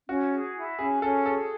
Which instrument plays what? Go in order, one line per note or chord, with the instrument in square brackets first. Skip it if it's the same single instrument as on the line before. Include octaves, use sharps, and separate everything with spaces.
[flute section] C#4 [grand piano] F#4
[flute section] G#4
E4
[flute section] C#4 [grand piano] G#4
[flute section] C#4 [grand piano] A4
[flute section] G#4 [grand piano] A4